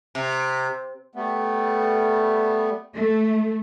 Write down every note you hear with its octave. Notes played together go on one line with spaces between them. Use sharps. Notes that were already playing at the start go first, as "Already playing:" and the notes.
C3
G3 A3 B3
A3